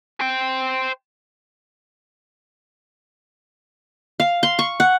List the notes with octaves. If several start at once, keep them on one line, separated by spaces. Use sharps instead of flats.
C5 G5
F5
C6
C#6
F#5